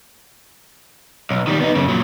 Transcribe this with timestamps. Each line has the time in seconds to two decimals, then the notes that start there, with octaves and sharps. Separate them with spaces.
1.31 B1
1.47 D#3 G3
1.60 B3 D#4
1.75 F#2 C#3
1.89 A#2 F#3